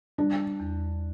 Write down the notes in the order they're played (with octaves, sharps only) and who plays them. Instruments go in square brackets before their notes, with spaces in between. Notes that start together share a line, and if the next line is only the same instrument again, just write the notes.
[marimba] G3 [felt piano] D4
[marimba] E2